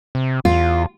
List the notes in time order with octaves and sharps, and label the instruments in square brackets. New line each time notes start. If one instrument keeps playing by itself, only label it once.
[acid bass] C3
[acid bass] E2 [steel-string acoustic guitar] F4